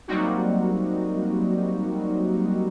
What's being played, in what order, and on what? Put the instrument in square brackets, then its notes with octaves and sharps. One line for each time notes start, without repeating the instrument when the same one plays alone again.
[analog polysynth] F#3 G3 A#3 C4 D#4 F#4